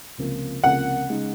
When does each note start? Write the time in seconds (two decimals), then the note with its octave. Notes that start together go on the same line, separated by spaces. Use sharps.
0.18 C#2 C3 F3 A#3 C#4
0.63 C#2 C3 F3 A#3 C#4 F#5
1.10 C#3 G#3 D#4